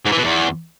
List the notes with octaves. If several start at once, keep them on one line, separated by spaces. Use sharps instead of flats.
G#2
E3
B2
E2